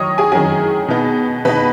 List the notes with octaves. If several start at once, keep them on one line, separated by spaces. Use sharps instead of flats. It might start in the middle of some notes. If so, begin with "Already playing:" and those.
Already playing: D#3 F#3 C#5 D#5 C#6 D#6
G#4 G#5
D#3 F#3 C#4 G#4 G#5
B2 B3 D#4
B2 B3 D#4 B4 B5